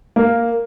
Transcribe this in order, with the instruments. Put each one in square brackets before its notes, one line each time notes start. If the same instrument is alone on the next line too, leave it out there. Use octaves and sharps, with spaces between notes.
[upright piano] A#3